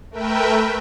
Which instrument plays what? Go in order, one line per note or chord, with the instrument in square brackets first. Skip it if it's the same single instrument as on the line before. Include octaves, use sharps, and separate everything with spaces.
[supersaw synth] A3 A#4 B4 E5 G5